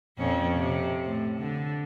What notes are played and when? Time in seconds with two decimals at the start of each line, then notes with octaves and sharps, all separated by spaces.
0.18 F2 A#2 C#4
0.55 C3
1.05 A2
1.39 D3